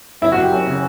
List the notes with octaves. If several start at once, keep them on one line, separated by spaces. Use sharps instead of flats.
F#1 E4
F#4
F#1 G4
F#2
C#3